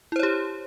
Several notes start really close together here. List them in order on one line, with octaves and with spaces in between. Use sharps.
E4 C5 C#5 G4